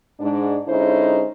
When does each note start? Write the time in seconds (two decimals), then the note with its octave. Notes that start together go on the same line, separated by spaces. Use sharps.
0.20 G#2 D4
0.68 D3 G#3 C#4 D#4 E4 C5